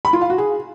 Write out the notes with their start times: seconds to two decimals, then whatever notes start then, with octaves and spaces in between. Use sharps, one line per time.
0.05 B5
0.13 F4
0.21 F5
0.30 F#4
0.38 G#4